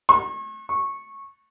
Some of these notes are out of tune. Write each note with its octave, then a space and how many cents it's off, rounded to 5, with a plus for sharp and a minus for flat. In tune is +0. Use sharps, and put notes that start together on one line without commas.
C#6 -40
C#6 -15